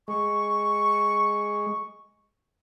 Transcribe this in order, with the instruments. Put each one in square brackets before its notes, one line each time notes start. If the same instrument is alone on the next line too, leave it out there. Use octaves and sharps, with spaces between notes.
[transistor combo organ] G#3 [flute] C#6